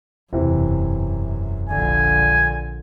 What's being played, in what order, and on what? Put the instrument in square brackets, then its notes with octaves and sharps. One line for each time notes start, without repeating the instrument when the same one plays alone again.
[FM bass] E1 [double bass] F#2 [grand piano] C3 E3
[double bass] A#1 D3 [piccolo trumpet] G#5